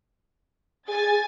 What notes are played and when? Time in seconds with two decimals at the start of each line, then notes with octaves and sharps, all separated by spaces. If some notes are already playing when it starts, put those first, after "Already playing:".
0.88 G#4 G#5 A6